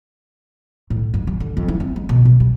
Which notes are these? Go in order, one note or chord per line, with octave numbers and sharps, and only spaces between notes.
A2
G2
G3
D3
F2
E4
C4
G#3
B2
B2
G3